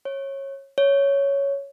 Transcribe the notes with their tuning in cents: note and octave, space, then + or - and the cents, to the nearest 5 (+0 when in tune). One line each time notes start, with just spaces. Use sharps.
C#5 -20
C#5 +5